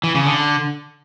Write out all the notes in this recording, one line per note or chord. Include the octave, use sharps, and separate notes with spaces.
E3
C#3
D3